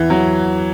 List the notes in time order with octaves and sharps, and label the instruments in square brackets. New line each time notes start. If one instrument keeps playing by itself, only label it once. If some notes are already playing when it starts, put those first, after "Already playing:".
Already playing: [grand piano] E2 [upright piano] E3
[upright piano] F#3